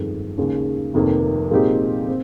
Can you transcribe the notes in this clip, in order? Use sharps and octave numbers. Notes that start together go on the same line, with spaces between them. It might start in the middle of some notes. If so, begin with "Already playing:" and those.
Already playing: G1 F2 D#3 G#3
D#2 C#3 G#3 C#4
F1 F2 C3 D#3 A#3
A#2 G#3 C4 D#4 G4
C4